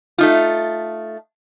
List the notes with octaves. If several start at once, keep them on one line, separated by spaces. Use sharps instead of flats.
A3 D#4 F4